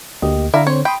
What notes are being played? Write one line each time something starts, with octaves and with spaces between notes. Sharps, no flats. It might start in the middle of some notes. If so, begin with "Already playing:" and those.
D2 A#3 G4 D#5
D3 E4 D5 F5 A#5
C4 C5 C#5
G5 B5 C6 D#6